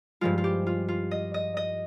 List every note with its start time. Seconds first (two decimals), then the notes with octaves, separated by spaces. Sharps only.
0.21 G2 F3 G#3 F4
0.38 F4
0.44 G4
0.67 F4
0.88 F4
1.11 D#5
1.34 D#5
1.57 D#5